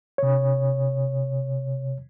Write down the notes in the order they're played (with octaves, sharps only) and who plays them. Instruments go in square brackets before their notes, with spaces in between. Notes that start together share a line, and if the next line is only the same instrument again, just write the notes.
[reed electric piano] C3 C#5